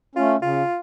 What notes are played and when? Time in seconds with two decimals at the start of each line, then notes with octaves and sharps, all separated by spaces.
0.15 A3 C#4 F4
0.42 C#3 F4